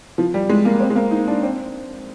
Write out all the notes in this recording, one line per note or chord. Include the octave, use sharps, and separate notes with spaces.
F3
G3
G#3
A#3
C4
G#3
A#3
D#4
D4
C4